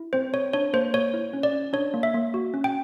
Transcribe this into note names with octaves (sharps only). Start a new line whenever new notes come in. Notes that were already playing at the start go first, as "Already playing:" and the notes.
Already playing: E4
C4 C5
C4 C#5
D4 C#5
A#3 C5
A#3 C#5
E4
C#4
D5
C#4
D4 C#5
A#3
E5
A#3
F#4
C#4
G5